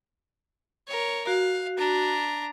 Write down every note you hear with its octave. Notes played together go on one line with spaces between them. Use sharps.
A#4 C#5
F#4 F5
D4 A#5